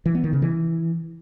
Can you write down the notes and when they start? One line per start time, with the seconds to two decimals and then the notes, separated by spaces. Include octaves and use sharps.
0.06 E3
0.15 B3
0.24 D#3
0.33 C#3
0.42 E3